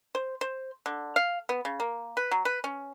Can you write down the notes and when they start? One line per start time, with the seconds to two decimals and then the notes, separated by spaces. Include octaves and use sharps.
0.15 C5
0.41 C5
0.86 D3
1.16 F5
1.49 B3
1.65 C#3
1.80 A#3
2.17 B4
2.31 F#3
2.45 B4
2.64 C#4